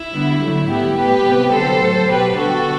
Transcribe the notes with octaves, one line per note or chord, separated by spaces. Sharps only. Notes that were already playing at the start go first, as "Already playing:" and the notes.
Already playing: E4
D3 G3 B3
D3 F#3 A3
A2 G3 B3 E4 G4
A2 G3 B3 G4 B4
C3 G3 B3
D3 F#3 B3 A4 C5
A2 F#3 A3
B2 F#3 B3 G4 B4
D3 G3 B3 F#4 A4